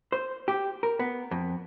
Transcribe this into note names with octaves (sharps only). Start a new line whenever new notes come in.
C5
G4
A#4
B3
F2